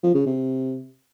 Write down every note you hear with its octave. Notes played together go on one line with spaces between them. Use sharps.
F3
C#3
C3